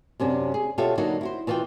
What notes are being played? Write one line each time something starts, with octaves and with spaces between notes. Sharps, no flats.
F#2 C3 C#4 D4
G#4
B2 F4 G4 A4 C#5 E5
D3 F#3 A#3 D#4 F#4
E4 F#4 C5
B2 E3 F4 B4 G5